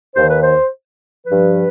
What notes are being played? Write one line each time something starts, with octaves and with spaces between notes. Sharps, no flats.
D#2 D#3 C5
B4
C5
G2 F3 B4